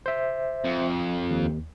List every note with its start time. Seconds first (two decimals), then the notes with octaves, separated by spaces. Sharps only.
0.06 C5 E5
0.65 F2
1.31 D#2